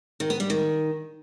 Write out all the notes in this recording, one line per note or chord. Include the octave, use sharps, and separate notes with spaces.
D#3
B3
G3
D#3